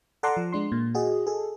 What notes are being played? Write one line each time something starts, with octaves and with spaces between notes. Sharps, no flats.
A4 D5 F#5 A#5 C6 D6
F3
G#3 D4 C6
A#2
F#4 G#4 D#5
G#4 A4